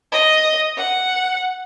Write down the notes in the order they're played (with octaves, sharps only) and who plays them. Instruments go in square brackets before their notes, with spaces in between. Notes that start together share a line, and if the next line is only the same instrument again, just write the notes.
[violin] D#5
F#5